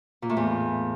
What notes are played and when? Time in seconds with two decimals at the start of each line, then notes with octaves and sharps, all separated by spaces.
0.22 A#2
0.29 A2
0.37 E2